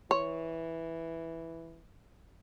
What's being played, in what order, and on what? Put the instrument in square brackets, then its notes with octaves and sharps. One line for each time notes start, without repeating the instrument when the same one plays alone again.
[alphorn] E3 [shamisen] C#5